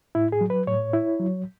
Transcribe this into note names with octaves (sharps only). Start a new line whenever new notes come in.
A2 E4
G#4
F#3
B4
A2 C#5
E4
F#3